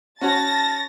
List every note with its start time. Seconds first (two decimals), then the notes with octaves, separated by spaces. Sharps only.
0.21 C#4 F#4 C#5 A5 A6 A#6